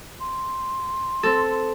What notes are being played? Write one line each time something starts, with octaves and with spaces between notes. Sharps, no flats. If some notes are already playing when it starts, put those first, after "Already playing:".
C6
C4 A4